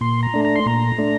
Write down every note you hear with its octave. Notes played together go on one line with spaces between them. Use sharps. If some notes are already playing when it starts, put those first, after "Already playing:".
A#2 C6
A#5
A3 D4
A#5
C6
A#2 A#5
A3 D4